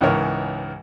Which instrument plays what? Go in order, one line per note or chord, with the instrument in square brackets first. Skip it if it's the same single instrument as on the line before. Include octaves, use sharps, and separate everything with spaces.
[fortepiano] C#2 G#2 E3 A#4 C#5